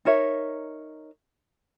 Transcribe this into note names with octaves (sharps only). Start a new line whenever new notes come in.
D#4 A#4 C#5 E5